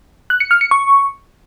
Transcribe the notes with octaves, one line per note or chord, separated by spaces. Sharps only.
F#6
C#7
F6
C#7
C#6